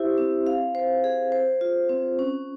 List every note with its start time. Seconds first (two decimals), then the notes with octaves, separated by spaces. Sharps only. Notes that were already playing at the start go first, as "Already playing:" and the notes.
Already playing: E4 G4 C5 E5
0.18 C4
0.47 F5
0.75 C5
1.04 G#4
1.32 C5
1.61 F4
1.90 C4
2.19 C#4